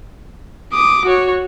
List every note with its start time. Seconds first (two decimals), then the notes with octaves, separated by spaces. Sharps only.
0.73 D6 D#6
1.06 F#4 C#5